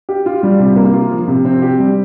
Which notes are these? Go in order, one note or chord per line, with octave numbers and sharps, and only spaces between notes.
G4
F4
G3
C3
A#3
F4
F3
C3
C4
G4
G3